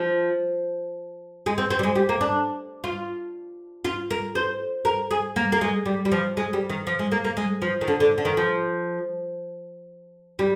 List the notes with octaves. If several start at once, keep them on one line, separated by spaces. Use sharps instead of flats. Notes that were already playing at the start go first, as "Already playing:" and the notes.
Already playing: F3
G#3
C4
C4
G3
G#3
G3
A#3
D4
F4
F4
A#4
C5
A#4
G#4
A#3
A#3
G#3
G3
G3
F3
G#3
G3
D#3
F3
G#3
A#3
A#3
G#3
F3
D#3
D3
D3
D3
D#3
F3
G3